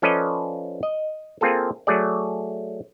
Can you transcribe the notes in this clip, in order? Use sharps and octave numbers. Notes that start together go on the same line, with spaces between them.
F3 C#4 A4 B4 D5 D#5
D#5
A#3 C4 F4 G#4 A4
F#3 A3 G#4 D5